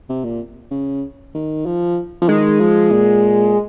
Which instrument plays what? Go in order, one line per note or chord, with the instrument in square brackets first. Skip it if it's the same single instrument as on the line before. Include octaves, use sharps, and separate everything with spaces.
[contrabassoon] C3
A#2
C#3
D#3
F3
F3
[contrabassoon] D#3 [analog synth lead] G#3
[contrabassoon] F3
A#2